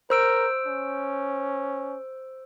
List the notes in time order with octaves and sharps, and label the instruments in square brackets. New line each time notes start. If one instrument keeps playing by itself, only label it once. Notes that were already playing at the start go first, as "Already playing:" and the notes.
[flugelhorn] A#4 [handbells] C5 E6 D7
[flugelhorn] C#4